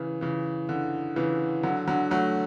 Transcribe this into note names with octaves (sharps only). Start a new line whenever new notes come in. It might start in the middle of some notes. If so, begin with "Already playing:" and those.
Already playing: C#3 E3
C#3 E3
D3
C#3 E3
D3 F#3
D3 F#3
F#3 A3